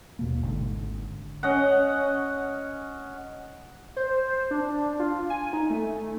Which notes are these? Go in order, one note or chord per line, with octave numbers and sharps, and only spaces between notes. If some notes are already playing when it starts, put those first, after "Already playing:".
D#2 B2 A#3
G#1 D3
C#4 D#5 F#5
C5
D4
F4
G#5
D#4
A3